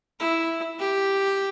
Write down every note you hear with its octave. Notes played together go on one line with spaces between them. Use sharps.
E4
G4